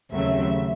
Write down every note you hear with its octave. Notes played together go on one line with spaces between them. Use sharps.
D#2 C#3 F#3 A3 C4 E5